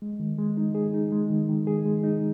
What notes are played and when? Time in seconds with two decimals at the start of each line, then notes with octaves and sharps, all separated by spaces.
0.02 G#3
0.20 D#3
0.38 G#3
0.57 D#4
0.75 G#4
0.94 D#4
1.12 G#3
1.30 D#3
1.49 D#3
1.67 G#4
1.86 G#3
2.04 D#4